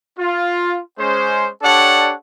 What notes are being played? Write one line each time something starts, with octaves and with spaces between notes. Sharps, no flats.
F4
G#3 C#4 C5
D4 G4 A4 C#5 D5 F#5